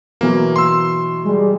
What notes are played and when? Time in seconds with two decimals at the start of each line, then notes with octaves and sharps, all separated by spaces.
0.21 B2 E3 F#3 A#3
0.56 C6 E6
1.25 G3 G#3